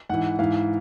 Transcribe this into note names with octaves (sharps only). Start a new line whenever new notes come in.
G#2 E3 F#5
G#2 E3 F5